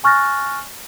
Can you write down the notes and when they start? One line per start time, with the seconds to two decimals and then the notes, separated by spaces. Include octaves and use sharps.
0.04 G#5 C#6 F6 F#6 A6 A#6